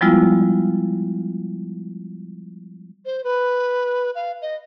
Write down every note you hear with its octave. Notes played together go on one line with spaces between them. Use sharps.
F3 G3 G#3 B3 E4 F4
C5
B4
F5
D#5